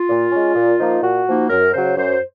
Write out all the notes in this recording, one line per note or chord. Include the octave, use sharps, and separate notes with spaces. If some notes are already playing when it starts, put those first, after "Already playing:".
Already playing: F4
A#2
G#3 C#4
A#2
F3 A#3 D#4
A#2 F#4
F3 A#3 D#4
F#2 A#4
C#3 F#3 C5
F#2 C5